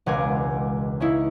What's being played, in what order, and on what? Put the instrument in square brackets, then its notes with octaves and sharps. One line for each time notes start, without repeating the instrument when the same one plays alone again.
[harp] E1 C#2 A#4 F#5 G#5 D6
C#4 D#4 E4